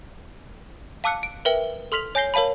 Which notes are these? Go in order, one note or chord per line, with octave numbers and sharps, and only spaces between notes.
F5 A5 D6 E6 F#6 C#7
D7
A#4 B4 E5 G5 G7
A4 C6 F6 B6 F7 F#7
C#5 G#5 G6 A#6 C7 G7
A#4 C#5 F5 A5 B5